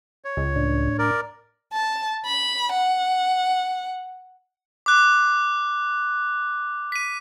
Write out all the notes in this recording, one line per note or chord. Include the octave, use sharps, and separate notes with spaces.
C#5
C#2
A2 D4
A#4 D5
A5
B5
F#5
D6 F#6
B6 D#7